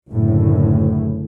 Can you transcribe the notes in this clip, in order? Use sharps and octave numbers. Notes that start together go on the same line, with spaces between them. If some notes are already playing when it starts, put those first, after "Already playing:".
F#1 D2 A2